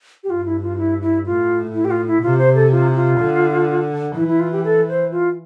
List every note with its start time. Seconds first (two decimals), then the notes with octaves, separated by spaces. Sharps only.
0.24 G4
0.30 G2 F4
0.46 E4
0.62 F4
0.78 E4
1.02 E4
1.26 A2 F4
1.74 E4
1.85 G4
1.91 F4
2.07 E4
2.23 C3 F4
2.39 C5
2.55 A4
2.71 F4
2.95 F4
3.20 D3
4.16 E3 E4
4.28 E4
4.40 F4
4.52 G4
4.64 A4
4.89 C5
5.12 F4